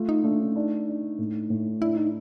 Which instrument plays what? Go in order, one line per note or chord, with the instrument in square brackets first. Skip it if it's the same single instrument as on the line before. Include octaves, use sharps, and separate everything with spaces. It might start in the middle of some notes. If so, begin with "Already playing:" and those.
Already playing: [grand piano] A3 F4
[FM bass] D#4
[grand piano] A3 [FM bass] D4
[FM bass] C#4
[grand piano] D4 [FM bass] D#4
[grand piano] D4
A2
A2
[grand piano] D4 [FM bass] E4
[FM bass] D#4